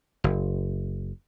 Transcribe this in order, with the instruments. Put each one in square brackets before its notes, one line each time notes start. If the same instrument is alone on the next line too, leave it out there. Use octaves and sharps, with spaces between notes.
[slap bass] F#1